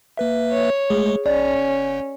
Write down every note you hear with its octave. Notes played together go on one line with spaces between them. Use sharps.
A#3 B4 E5
C#5
G#3 A3 G#4
A#1 C#4 D5
G1